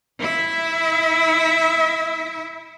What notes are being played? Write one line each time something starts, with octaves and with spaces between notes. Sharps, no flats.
E4 E5